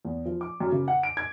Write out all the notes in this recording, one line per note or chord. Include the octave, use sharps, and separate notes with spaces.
E2
F3
D6
F#2
C#3
F#5
D7
G#6